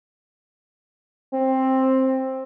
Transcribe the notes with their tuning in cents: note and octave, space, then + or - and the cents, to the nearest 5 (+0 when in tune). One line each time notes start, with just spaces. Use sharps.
C4 +10